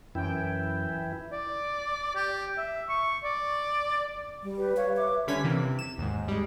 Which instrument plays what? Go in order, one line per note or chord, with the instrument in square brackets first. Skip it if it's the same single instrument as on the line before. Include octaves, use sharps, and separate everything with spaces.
[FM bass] F#2 [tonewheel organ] E3 E4 [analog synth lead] G5
[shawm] D5
G4
E5
C#6
D5
[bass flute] G3
[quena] G4 [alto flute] B4
[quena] C#5 [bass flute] F5
[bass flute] E5 [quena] D6
[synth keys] D3 G3 C#4 G#6 B6
C3 E3 A#3
C3
E7
D#2 G#2
G3 G#3